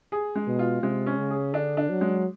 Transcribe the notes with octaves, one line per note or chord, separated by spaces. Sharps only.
G#4
G#3
B2
F4
C3 G#3
C#4
C#3
G#4
D3 D4
D4
F#3
G#3